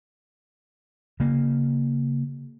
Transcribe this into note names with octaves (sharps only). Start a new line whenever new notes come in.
C#3 A#3